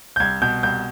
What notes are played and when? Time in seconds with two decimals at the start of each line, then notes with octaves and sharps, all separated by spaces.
0.16 G6
0.20 C2 G#6
0.42 B2 G6
0.63 C2 G6